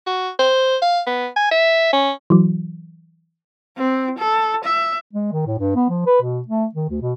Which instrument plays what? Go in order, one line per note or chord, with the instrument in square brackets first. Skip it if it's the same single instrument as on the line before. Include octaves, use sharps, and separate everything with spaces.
[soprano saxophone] F#4
C5
F5
B3
G#5
E5
C#4
[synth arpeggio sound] E3 F#3
[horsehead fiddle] C4
A4
E5
[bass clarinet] G#3
D#3
A2
G2
B3
F3
B4
B2
A3
D#3
D2
B2